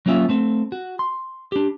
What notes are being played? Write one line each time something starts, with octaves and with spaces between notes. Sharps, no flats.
F#3 A#3 C#4 F4 E5
A3 C4
F#4
C6
D4 G4